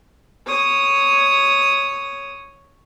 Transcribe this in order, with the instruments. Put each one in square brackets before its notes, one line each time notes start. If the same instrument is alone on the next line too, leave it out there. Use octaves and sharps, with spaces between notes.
[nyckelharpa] C#5 D#6